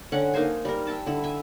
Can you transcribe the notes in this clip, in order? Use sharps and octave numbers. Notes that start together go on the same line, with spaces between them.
D3 C#4 F#5 G5
A#3 D#4 C5 G#5
G3 A#4
E5 G5 A5
D3 E4
E5 G#5